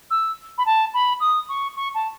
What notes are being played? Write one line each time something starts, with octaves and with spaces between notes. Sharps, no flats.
E6
B5
A5
B5
D#6
C#6
C#6
A5